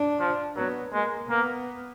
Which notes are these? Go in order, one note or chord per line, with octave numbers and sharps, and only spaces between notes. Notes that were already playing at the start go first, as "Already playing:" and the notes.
Already playing: D4
F3
F#3 B3
G#3 A#3
A#3 B3